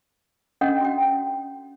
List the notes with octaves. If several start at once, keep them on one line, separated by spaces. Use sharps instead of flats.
C#4 D4 A4 D#5 F#5 G5
F#4 G5